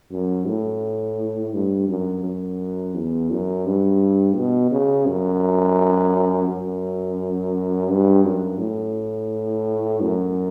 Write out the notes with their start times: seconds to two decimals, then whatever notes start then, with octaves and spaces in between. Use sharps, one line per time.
0.12 F#2
0.48 A2
1.54 G2
1.89 F#2
2.24 F#2
2.95 E2
3.31 F#2
3.66 G2
4.37 B2
4.71 C#3
5.07 F#2
6.48 F#2
7.90 G2
8.25 F#2
8.59 A2
10.01 F#2